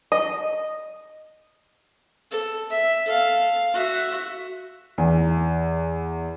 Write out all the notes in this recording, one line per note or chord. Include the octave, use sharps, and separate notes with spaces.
D#5
A4
E5
A4 F5
F#4 E5
E2